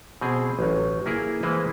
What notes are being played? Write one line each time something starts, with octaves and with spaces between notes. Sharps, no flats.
B2 C4 G#4
A1 F#3
A#3 E4 G#4 A#4
E3 G#3 A#3 E4 B4 C5